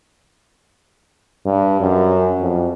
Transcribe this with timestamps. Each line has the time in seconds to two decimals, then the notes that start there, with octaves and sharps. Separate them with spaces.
1.46 G2
1.81 F#2
2.41 F2